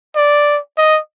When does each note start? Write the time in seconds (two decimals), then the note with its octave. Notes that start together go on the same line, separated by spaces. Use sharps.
0.16 D5
0.77 D#5